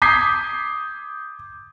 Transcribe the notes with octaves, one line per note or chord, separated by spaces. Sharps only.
D6 D#6 G6 G#6 B6 C7